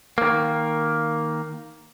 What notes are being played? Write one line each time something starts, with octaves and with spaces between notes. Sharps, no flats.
D#3 A#3